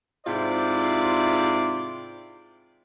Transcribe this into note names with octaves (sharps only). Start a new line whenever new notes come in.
G#2 C3 E4 F4 C5 D5